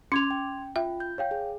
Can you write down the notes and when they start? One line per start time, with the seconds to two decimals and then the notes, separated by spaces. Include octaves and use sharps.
0.12 C#4 C6 D6 G#6 F7
0.30 G5
0.76 F4 E5 G5
1.00 G6
1.18 C#5 F5 G5
1.31 G#4